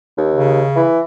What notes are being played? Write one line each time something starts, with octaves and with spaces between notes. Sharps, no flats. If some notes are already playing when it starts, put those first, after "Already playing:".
D#2
C#3
E3